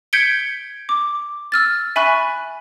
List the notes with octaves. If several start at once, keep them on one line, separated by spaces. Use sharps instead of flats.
G6 G#6 B6 C#7 D7 G7
D6
E6 F6 A6
E5 G#5 B5 C#6 F#6